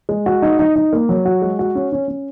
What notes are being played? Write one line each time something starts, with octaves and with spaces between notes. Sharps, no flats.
G#3
F#4
D#4
D#4
D#4
A#3
F#3
F#4
G#3
F#4
C#4
C#4
C#4